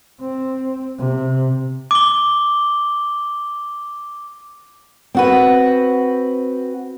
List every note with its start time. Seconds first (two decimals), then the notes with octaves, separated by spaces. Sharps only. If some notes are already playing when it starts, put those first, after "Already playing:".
0.21 C4
0.99 C3
1.91 D6 G7
5.15 C4 F#4 B4